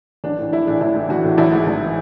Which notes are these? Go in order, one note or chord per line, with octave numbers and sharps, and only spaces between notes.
A1 D4
A2 E3
A1 E4
A2 E3 D4
A1 E4
A2 E3
A1 F#4
A2 E3
A1 E4
G#2 E3
A1
E3